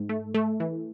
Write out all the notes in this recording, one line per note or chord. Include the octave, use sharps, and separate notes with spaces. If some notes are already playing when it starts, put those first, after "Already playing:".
Already playing: G#2
A3
A3
E3